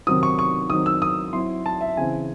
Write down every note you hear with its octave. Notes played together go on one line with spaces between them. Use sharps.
C3 D#3 F#3 C4 D#4 D#6
C#6
C#6
D#3 F#3 C4 D#4 D#6
E6
D#6
F#3 C4 E4 C6
A5
E5
C#3 E3 C4 E4 G#5